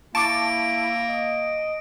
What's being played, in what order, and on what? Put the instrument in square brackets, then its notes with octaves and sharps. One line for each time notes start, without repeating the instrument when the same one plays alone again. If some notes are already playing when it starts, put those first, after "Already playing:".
[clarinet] A#3 [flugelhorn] E4 [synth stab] A5 C#6 D6 [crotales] D7
[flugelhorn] D#5